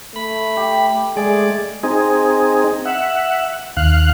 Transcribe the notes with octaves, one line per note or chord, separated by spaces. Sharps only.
A3 B5
G4
G#3 A3 G#4 D5
C4 D#4 G#4
E5 F#5
D#2 F5 F#6